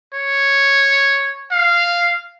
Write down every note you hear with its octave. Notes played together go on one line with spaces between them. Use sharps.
C#5
F5